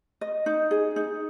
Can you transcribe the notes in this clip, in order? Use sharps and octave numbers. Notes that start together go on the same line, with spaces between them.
D#5
D#4
G#4
D#4